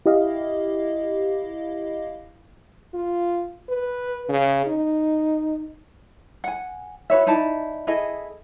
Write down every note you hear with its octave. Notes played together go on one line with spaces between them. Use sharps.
E4 G4 D#5 F5
F4
B4
C#3
D#4
F#5 G#5
F#4 B4 C#5 E5
D#4 E4 D5 A5
E4 G#4 A4 D#5